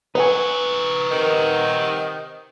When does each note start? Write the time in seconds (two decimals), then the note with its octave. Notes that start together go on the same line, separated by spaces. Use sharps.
0.15 D#4 F#4 B4 F#5 G#5
1.11 C3 D#3